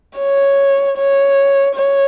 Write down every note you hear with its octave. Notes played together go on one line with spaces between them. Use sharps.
C#5
C#5
C#5